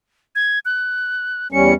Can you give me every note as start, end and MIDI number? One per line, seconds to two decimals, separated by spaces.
0.35 0.59 92
0.65 1.48 90
1.52 1.74 40
1.52 1.74 55
1.52 1.74 61
1.52 1.73 97